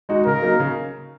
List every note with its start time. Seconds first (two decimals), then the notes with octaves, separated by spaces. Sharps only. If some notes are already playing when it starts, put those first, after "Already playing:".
0.09 G#3 D#4 F#4
0.26 C#3 A#4
0.42 F#3 A#3 D#4
0.60 C#3